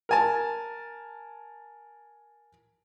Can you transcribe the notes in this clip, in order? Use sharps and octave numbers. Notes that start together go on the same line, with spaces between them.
A#4 G#5 A5